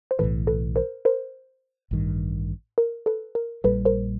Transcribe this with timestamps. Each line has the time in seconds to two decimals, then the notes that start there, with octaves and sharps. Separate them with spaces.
0.11 C5
0.19 B1 A2 E3 A4 B4
0.47 A4 B4
0.76 A#4 C5
1.05 A#4 C5
1.91 A1 G2 D#3
2.78 A#4
3.06 A4 B4
3.35 A#4
3.64 A#1 A#2 G3 A4 B4
3.85 A#4 C5